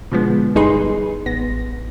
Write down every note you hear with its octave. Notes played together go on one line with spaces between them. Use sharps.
B2 D3 F3 G#3 B3
G1 G3 D#4 G#4 B4 C6
A1 B3 A#6